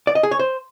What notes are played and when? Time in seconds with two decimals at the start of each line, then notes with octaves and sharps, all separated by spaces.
0.07 D5
0.15 D#5
0.23 G#4
0.31 C#5
0.39 C5